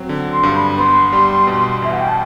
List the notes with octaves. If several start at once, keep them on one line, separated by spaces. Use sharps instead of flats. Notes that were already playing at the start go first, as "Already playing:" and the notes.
Already playing: F#3 C4
D3
C6
G2
B5
B3 C6
G3
B2
E2 E5
F#5
G5
A5